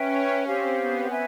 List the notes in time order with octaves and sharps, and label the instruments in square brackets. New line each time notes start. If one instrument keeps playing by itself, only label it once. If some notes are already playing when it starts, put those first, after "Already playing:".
Already playing: [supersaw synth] C#4 [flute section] B4 E5 G5
[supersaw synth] C4 [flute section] G4 C5 F5
[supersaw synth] B3
[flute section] B4 E5 G#5